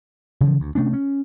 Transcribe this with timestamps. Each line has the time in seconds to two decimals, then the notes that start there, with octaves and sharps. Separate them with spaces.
0.41 C#3 E3 F3
0.60 D2
0.75 C3 A3 C#4 D4
0.93 C#4